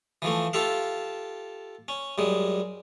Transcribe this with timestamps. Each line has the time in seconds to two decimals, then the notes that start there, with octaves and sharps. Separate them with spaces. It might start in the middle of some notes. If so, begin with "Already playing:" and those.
0.22 E3 F3 A3
0.53 F4 G4 A4 E5 F5
1.88 C#4
2.18 F#2 G3 G#3